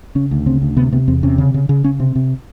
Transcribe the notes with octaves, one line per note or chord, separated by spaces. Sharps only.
C#3 C#4
D2
C#3 C4
D2
C3 B3
C3 B3
E2 C4
C3 C#4
C#3
C#3
C#3
C#3 C#4
C3 C4
C3